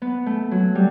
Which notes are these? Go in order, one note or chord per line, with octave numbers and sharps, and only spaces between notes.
B3
A3
F#3
G3